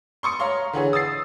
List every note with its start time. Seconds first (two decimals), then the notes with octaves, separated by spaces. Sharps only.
0.23 C6 C#6 D#6 C#7
0.39 C#5 F5 A#5 C6
0.73 D3 E3 G#4 C#5
0.93 D#6 E6 A6 C7